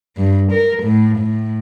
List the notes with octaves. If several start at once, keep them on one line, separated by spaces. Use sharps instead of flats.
G2
A#4
A2
A2